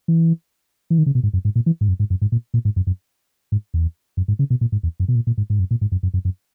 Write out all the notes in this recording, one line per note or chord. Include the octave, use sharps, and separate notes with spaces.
E3
E3
D#3
C#3
B2
G#2
F#2
G#2
A#2
E3
G#2
F#2
G#2
F#2
G#2
A#2
A#2
G#2
F#2
F#2
G#2
E2
F#2
G#2
C#3
B2
A#2
G#2
E2
F#2
B2
A#2
A#2
G#2
G#2
F#2
A#2
G#2
F#2
F#2
F#2
F#2